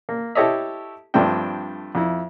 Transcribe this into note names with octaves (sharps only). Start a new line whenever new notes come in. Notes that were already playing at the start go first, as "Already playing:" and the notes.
A#3
E4 G4 A4 C#5 D#5 E5
G2 F3 A3 C4 D4 G5
F2 E4